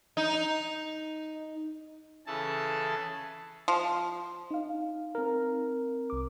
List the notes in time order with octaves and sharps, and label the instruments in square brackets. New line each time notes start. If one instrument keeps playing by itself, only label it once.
[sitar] D#4
[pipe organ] C#3 E3 G#4 A4 A5
[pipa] F3
[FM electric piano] D#4 F5
[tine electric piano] C4 A#4
[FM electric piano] C2 D6